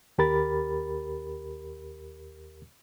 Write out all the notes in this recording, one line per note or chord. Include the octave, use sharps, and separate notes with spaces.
D#2 G4 A#4 B5 A6